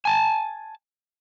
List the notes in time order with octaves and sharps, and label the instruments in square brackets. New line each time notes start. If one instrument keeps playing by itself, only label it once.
[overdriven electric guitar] G#5 A5